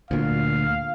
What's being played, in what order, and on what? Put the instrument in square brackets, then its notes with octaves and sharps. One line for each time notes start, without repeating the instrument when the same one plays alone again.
[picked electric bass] D2 A#2 [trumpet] F5